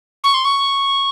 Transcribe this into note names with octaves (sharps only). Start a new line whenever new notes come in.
C#6
C6
C#6